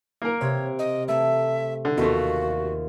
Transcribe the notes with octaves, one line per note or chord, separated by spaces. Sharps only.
A#3 A#4
C3 C#5
D#5
A3 E5
D3
D#2 B2 A3 F4 F#4